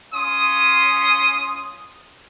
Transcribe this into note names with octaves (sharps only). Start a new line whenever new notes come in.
C#4 F4 C6 D#6